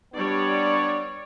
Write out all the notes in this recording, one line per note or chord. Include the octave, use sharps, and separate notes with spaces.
G3 B3 D4 C#5 D5